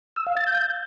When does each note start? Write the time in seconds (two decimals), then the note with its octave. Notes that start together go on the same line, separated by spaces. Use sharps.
0.16 E6
0.26 F5
0.37 A6
0.47 G6